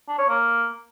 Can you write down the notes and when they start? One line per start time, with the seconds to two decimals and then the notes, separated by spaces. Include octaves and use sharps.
0.08 D4
0.19 C#5
0.29 A#3